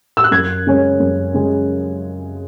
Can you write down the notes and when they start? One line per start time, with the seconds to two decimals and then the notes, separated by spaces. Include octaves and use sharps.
0.17 E6
0.24 F#6
0.31 F#2 G#6
0.67 C#3 G#3 C#4
1.00 F#2
1.34 C#3 G#3 C#4